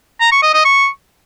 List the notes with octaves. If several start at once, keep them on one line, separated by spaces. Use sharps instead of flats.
A#5
C#6
D#5
D#5
C#6